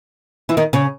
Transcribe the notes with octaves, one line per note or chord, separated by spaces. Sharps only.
E3 E4
D#3 D#4
C#3 C#4